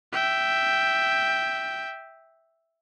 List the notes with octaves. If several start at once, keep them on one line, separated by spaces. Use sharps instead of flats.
E5 G5